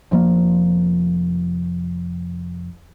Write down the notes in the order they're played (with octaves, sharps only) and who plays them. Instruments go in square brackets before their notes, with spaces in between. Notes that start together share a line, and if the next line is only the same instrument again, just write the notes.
[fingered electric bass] F1 F3 A#3